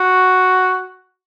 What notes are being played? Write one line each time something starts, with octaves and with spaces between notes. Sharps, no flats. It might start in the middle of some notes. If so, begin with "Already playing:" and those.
Already playing: F#4